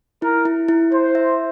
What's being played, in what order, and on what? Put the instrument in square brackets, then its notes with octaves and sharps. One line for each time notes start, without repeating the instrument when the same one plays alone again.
[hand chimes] E4 [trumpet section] A#4
[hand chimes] E4
E4
[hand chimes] E4 [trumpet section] C5
[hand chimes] E5